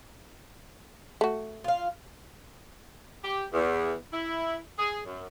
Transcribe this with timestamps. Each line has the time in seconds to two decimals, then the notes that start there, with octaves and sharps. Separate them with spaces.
1.21 A3 F#4
1.64 F4 F5
3.22 G4
3.52 E2
4.11 E4
4.77 G#4
5.05 F#2